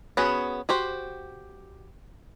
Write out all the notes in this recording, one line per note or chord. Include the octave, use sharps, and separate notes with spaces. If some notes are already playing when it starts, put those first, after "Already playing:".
B3 C#4 F#4 G#4 B4
F#4 G4 C5